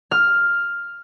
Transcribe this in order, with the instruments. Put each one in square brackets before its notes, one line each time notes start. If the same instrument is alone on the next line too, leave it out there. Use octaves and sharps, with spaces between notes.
[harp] F6